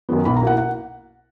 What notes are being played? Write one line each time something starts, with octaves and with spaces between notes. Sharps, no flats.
F#2 D#3 F#3 B3
B1 B5
A#5
B2 A#3 E4 F#5
F#5